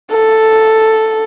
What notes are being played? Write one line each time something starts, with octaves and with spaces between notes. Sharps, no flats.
A4